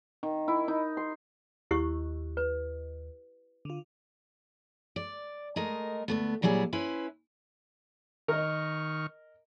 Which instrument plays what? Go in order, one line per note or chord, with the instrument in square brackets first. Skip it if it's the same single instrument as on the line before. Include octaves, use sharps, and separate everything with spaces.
[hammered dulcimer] D#3
E4
D#4
C6
[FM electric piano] D#2 [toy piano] E4 G4 C#6
[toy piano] B4
[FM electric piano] D3 F4
[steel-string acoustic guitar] D5
G#3 A3 A#4 D#5
D2 A3 B3
A#2 F#3 G3 E4 G#4
C#4 E4 B4 C5
[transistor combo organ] D#3 C#6 F6 [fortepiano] A#4 D#5